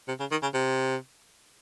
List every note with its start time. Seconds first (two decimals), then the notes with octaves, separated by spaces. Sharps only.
0.08 C3
0.20 C#3
0.32 D#3
0.43 C#3
0.54 C3